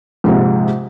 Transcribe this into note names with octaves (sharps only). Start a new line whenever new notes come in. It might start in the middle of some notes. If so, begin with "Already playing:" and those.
A#1 G#2 C3